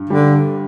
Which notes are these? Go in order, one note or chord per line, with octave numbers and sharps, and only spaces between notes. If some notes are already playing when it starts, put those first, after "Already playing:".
Already playing: G2
D3 G3